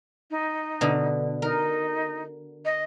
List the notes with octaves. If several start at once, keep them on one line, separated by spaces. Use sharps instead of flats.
D#4
B2 D3
D#4 A#4
D#5